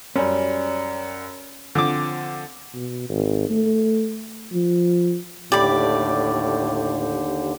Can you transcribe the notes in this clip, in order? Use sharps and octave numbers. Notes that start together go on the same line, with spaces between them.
F#2 G3 C#4
D3 F3 C4 D6
B2
G#1
A3
F3
D#2 A2 D3 G4 D5 B5